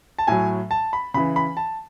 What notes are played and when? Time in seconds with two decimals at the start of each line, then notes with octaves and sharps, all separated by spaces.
0.19 A5
0.27 A2 F#3 G#5
0.71 A5
0.93 B5
1.14 C#3 E3 B5
1.36 B5
1.57 A5